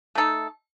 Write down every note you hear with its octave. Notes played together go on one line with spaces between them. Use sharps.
A3 D#4 A4